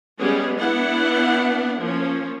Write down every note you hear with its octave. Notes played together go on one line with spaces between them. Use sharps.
G3 G#3 B3 C#4 G#4
B3 D4 E4 E5 F#5
F3 A#3 C#4